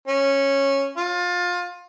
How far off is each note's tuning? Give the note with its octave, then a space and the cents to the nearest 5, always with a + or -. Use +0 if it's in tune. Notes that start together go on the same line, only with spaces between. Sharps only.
C#4 -10
F4 +25